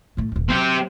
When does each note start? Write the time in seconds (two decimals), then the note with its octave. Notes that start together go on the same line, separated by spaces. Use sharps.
0.17 A2 A3
0.32 D#1 C2
0.50 F#3 C4 G4